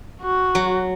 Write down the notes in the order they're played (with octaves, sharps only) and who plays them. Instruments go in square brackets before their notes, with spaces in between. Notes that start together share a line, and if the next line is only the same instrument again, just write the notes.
[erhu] F#4
[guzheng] F#3